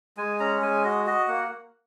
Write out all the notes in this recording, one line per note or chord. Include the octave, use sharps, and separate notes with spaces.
G#3 G#5
C#4 A#5
G#3 G#5
F#4 D#5
F#4 D#5
A#3 F#5